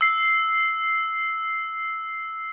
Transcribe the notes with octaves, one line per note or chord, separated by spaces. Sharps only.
E6 C7